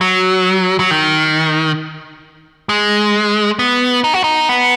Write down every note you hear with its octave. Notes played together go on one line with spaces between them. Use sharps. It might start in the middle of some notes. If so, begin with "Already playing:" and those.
F#3
F#3
D#3
G#3
B3
D#4
F#4
D#4
B3